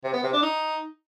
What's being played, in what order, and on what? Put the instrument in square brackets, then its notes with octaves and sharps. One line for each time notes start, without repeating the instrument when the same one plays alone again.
[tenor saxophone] C3
B3
C3
D4
D#4